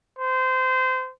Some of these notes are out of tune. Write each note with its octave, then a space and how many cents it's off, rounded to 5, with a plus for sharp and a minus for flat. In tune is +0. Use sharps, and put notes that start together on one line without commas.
C5 -25